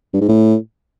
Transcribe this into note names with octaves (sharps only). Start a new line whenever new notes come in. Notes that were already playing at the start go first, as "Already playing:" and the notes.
G2
G#2
A2